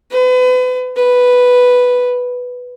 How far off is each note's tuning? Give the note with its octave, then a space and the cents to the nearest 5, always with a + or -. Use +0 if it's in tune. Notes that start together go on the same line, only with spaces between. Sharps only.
B4 +35
B4 +0